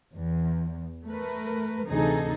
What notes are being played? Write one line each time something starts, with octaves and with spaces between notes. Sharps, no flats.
E2
A3 A#4 B4
D2 C3 E3 D#4 G#4 A4